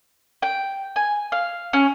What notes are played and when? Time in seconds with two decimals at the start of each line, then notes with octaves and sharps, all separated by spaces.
0.42 G5
0.96 G#5
1.32 F5
1.73 C#4